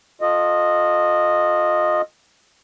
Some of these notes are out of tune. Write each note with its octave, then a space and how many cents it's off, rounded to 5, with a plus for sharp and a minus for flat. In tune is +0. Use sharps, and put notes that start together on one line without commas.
F4 +20 A4 +0 D#5 -10